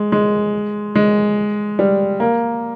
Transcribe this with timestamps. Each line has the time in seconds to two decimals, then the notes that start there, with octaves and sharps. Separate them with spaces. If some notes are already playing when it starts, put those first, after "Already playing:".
Already playing: G#3
0.12 G#3
0.95 G#3
1.79 G3
2.20 A#3